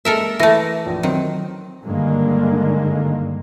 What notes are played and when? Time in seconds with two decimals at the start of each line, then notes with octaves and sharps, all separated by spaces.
0.05 G#3 A#3 A4 A#4 E5
0.39 E3 A3 E4 A#6 D#7
0.86 A#1
1.03 D#3 F#3 C4
1.83 G2 D3 D#3 G#3 A#3